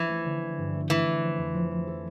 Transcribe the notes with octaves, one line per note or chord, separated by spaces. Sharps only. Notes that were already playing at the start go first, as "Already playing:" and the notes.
Already playing: E3 F3 C#4
A3
D3
A3
G2
A3
E3 A3
E4
F3
F2
F3
F3
A4